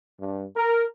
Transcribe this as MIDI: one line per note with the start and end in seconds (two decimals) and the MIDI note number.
0.20 0.44 43
0.55 0.85 70